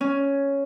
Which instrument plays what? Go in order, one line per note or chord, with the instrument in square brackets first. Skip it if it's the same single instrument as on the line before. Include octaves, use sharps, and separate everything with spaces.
[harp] C#4